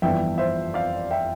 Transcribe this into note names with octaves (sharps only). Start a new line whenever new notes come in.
G1 F2 E3 G3 B3 E5 G5
C5 E5
D5 F5
E5 G5